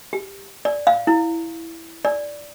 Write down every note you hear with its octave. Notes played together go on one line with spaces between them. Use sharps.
G4
D5
F5
E4
D5